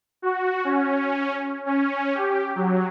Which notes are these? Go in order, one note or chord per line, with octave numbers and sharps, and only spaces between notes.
F#4
C#4
C#4
G4
F#3